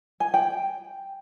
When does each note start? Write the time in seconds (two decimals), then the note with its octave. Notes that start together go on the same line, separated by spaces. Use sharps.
0.20 G#5
0.34 G5